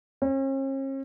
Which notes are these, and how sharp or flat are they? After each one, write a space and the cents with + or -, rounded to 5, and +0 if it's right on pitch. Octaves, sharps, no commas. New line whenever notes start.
C#4 -45